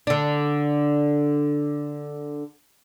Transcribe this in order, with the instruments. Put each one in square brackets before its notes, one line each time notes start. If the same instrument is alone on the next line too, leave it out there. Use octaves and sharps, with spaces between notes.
[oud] D3 D4